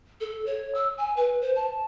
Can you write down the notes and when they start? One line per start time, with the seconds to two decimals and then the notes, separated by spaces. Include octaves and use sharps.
0.21 A4
0.46 C#5
0.75 E6
0.98 G#5
1.17 B4
1.41 C5
1.56 A5